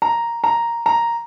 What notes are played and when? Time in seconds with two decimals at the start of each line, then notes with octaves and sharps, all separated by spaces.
0.02 A#5
0.44 A#5
0.86 A#5